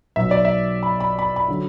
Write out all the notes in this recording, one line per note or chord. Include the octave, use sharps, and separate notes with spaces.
B1 B2 F#3 E5
D5
E5
B5
B5
B5
B5
D3 F#3